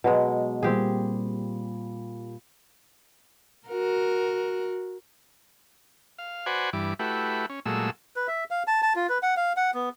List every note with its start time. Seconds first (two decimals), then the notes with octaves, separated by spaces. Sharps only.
0.04 B2 F#3 G#3
0.63 A#2 G3 C4 G4 G#4
3.68 F#4 A#4
6.18 F5
6.46 F#4 B4 C5 D5 F#5 G#5
6.73 G2 E3 D6
6.99 A3 E4 F#4 G4 B4
7.50 C#4
7.66 A#2 F#3 G#3 A3 E6
8.16 B4
8.27 E5
8.51 F5
8.67 A5
8.82 A5
8.96 F4
9.09 B4
9.23 F#5
9.37 F5
9.57 F#5
9.74 B3